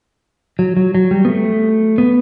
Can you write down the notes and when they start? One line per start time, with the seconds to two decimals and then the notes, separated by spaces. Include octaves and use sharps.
0.59 F#3
0.77 F#3
0.95 F#3
1.11 G3
1.25 B3
1.29 A3
1.98 B3